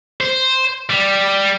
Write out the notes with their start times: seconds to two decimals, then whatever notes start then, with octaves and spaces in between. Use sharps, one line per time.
0.21 C5
0.90 G3